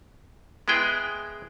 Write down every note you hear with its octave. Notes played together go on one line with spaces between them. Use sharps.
G#3 B3 E4 G#4 G5